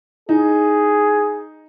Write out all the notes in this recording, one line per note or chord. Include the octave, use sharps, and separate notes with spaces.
D#4 E4 G#4